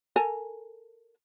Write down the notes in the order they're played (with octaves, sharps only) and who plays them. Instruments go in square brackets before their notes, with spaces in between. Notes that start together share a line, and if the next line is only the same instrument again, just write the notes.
[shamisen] A4 A#4 G#5